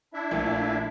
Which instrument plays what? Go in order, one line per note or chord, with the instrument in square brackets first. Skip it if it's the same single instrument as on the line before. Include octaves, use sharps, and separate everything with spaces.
[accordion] D4 E4 E5
[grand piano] A#1 A#2 A3